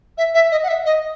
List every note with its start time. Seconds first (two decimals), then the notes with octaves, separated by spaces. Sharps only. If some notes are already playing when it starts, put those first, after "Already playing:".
0.18 E5
0.34 E5
0.52 D#5
0.63 F#5
0.68 E5
0.85 D#5